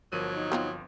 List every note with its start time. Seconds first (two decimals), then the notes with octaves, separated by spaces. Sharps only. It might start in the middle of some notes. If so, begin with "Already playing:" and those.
0.12 G1 F3 F#3 A#4 D#7
0.34 D#4
0.52 B3 C4 F4